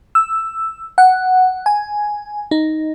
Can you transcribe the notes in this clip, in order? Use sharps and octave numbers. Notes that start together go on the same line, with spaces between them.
E6
F#5
G#5
D#4